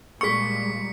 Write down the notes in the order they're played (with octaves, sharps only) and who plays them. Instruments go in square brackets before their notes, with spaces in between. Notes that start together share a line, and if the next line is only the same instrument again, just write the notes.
[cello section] A#2 G3 G#3 [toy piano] G#4 C#6 [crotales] B6 C#7